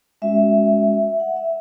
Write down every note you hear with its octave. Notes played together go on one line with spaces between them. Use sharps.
G#3 C#4 F#4 E5
F#5
E5